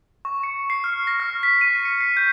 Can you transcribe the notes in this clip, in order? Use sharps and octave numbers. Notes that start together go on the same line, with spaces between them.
C#6
C#7
C7
F6
A#6
F6
B6
D#7
C#7
C7
G6